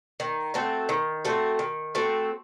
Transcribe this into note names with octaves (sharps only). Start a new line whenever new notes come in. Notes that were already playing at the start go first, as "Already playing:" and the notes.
D#3
A3 C4 F#4
D#3
A3 C4 F#4
D#3
A3 C4 F#4